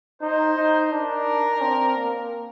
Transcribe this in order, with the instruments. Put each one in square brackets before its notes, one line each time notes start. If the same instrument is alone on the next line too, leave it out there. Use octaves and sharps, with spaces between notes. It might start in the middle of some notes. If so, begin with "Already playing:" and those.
[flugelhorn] D#4 [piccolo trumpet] C5
[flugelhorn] D#4
[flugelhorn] D4 [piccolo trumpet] A#4
[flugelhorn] C4
A#3